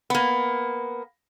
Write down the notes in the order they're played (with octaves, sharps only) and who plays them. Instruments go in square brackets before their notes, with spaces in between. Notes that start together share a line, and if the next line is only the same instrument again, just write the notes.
[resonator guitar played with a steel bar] A#3 B3